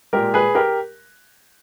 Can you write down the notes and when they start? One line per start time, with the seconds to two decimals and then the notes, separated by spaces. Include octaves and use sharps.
0.13 A#2 G#3 G4 A#4
0.34 G#4 B4
0.55 G4 A#4